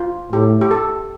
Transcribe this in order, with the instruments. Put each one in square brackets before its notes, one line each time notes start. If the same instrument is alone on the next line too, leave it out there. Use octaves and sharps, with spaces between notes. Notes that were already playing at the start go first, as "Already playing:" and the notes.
Already playing: [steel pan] F4
[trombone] A2 [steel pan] G4
[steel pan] G4
A4